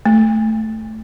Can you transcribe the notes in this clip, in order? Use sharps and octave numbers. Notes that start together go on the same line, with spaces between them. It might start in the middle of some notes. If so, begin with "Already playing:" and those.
A3